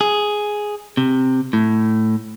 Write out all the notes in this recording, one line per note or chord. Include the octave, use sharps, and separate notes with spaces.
G#4
C3
A2